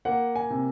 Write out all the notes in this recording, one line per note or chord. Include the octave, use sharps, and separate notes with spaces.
A#3 F#5
G#5
C3